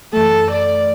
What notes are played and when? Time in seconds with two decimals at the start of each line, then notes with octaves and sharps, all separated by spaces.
0.13 F#2 E3 A3 A4
0.50 D5